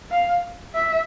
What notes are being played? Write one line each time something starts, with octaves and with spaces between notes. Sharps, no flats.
F5
E5